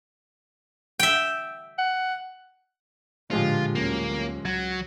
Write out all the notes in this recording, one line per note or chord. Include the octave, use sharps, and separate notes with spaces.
E5 G5
F#5
A1 A#2 D3 F3 G#3 F4 G4
D2 F#3 A#3 C#4
C#2 F#3 G#6